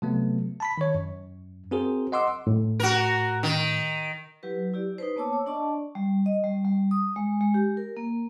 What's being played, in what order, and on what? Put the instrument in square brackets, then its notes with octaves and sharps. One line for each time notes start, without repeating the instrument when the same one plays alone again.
[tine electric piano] C3 F#3 A3 B3
A5 B5 B6
D#3 C#5
F#2
C4 F#4 G#4 A#4 C5
D#5 F#5 C6 D6 E6
[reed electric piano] A2
[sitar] F#4 A#4
D#3
[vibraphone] F#3 E4 G4 B4
E4 G4 D5
D#4 B4 C5
A#3 B3 C#5 A5 D6 E6
C#5
D4 D5 D#5 A5 C#6
G3
D#5
G3
G3
D#6
G#3
G#3
G4
A#4
A#3